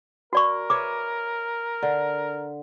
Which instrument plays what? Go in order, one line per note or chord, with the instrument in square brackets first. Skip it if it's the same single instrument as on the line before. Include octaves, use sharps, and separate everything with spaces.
[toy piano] F#4 D5 C#6 [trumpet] A#4
[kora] B4 C#5 E5 [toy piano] D6
[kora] D3